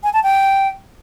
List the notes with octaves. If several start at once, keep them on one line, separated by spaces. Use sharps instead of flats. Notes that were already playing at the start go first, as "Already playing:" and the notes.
G#5
A5
G5